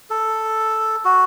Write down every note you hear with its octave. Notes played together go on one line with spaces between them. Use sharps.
A4
F#4